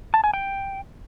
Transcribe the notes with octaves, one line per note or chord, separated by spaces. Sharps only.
A5
G#5
G5